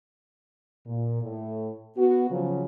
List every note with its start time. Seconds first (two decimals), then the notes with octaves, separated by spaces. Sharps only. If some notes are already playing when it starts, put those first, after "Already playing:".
0.86 A#2
1.22 A2
1.97 B3 F#4
2.29 C#3 F3 F#3